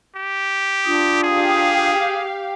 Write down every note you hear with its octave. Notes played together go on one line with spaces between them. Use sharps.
G4
D4 F4 D#6
G4 G#4 F5